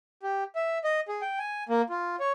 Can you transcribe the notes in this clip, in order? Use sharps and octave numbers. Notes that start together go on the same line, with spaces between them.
G4
E5
D#5
G#4
G5
G#5
A#3
F4
C#5